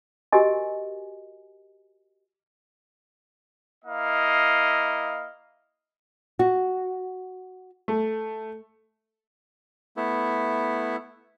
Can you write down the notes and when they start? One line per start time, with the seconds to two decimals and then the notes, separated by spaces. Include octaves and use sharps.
0.32 F#4 G4 A#4 D#5 G#5
3.85 A#3 E4 D#5 F5
6.39 F#4
7.88 A3
9.97 A3 B3 E4